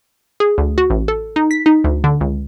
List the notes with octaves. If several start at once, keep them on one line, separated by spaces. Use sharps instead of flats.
G#4
D2
F#4
A1
A4
D#4
B6
D#4
D2
D3
C#2